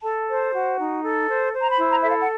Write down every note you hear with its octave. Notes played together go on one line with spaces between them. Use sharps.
A4 A5
C5
F#4
D#4
A4
C5
C5
A#5
B5
E4
A#5
A4 E5
F5
F#5